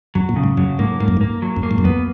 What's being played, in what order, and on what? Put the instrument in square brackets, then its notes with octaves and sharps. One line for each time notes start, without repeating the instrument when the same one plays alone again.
[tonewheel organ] F#2 [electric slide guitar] F#3
[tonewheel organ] A#2
[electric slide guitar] C#3
[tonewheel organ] G#2
[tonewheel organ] F#2 [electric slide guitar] F#3
[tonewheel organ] G#2 [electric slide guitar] A#3
[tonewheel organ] G#2 [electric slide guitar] A#3
[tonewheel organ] F#2
G#2
[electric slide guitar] A#3
F#3
[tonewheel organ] F#2
[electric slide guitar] A#3
[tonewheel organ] G#2
F#2
[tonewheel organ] F2 [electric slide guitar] B3